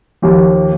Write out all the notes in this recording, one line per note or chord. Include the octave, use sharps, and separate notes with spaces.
D#2 F3